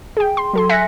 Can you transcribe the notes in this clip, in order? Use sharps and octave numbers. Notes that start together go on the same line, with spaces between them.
G#4 G5
C6
F#3 A4 C6
E5 G#5 F#6 A#6 B6 C#7